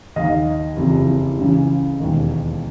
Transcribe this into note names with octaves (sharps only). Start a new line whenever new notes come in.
D#2 D#3 D#5 F5
F#1 F2 C3 E3
C#2 C#3 E3
E1 D#2 D#3